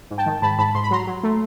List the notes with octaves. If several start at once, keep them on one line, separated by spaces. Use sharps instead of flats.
G#2
G5 A5
D#3
G#2 A5 B5
G#2 A5 B5
G#2 C6
B5
F#3 A#5 C6
F#3
A3